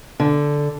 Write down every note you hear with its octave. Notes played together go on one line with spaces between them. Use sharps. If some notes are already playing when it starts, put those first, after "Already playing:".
D3